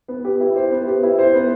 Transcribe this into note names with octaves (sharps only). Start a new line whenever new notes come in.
B3
G4
E4
C5
B3
G4
E4
C5
B3